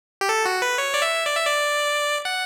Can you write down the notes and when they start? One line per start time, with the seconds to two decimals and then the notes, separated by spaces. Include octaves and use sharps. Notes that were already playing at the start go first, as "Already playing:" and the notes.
0.21 G4
0.29 A4
0.46 F#4
0.62 B4
0.78 C#5
0.94 D5
1.02 E5
1.27 D5
1.36 E5
1.45 D5
2.25 F#5